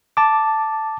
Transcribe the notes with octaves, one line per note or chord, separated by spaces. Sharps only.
A5 D6